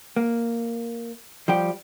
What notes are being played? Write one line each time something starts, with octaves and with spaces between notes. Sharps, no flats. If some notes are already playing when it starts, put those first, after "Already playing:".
A#3
F3 G3 G4